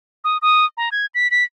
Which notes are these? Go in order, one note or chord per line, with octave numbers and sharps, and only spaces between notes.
D#6
D#6
A#5
G#6
B6
B6